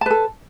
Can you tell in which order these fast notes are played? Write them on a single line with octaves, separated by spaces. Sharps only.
A5 B4 A4